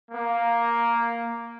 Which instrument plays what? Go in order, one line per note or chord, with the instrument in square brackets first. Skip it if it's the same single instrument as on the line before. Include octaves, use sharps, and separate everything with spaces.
[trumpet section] A#3